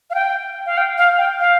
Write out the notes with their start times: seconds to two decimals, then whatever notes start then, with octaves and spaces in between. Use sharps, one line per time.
0.10 F5
0.15 G5
0.66 F5
0.77 G5
0.97 F5
1.18 G5
1.40 F5